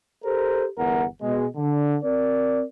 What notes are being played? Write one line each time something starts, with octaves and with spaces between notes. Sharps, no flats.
G4 A4 A#4 C5
G1 E2 A#4 F#5
B2 G#3
D3
C4 A#4 D5